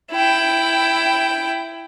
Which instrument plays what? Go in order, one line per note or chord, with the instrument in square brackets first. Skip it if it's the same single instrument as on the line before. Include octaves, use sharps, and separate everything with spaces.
[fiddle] E4 G5